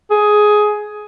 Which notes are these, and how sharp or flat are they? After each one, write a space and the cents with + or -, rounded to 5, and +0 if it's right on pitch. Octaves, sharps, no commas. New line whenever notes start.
G#4 +10